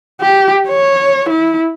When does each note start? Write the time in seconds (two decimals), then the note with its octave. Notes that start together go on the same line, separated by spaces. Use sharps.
0.21 G4
0.68 C#5
1.30 E4